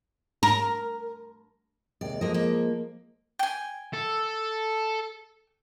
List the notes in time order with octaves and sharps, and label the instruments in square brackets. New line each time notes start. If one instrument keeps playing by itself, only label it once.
[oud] A#4
[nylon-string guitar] D#2 C3 G#3 [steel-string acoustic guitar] D5
[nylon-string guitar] F3 G#3 [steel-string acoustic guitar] A#3 D#5
[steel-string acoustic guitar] A#3
[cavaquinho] G5 G#5
[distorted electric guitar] A4